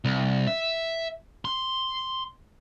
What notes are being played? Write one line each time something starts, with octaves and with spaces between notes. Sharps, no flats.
C2
E5
C6